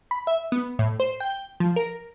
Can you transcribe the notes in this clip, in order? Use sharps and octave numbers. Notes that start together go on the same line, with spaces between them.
B5
E5
B3
A2
C5
G5
F3
A#4